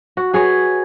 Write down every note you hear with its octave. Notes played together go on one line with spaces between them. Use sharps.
F#4
F#4 G#4 B4 C#5